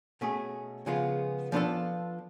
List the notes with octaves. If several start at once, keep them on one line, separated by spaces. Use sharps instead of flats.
B2 A3 C#4 G#4
C#3 F3 G#3 B3 F4
F3 B3 D4 F4 A4